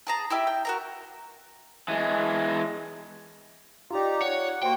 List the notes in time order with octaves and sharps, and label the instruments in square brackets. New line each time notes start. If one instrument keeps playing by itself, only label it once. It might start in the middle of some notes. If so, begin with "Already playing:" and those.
[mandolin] G#4 A5 A#5
E4 G4 E5
G5
F#4 A#4 A#5
[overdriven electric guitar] E3 G#3
[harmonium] D#4 G4 A#5 [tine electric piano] F4 D5
[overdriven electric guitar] C#5 [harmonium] F#5
[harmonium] A#3 F#4 [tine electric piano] C5 C6 [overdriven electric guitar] G5